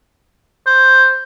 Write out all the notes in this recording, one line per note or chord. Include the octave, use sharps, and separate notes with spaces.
C5